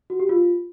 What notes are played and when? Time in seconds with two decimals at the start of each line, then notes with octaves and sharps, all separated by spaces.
0.10 F#4
0.20 G4
0.29 F4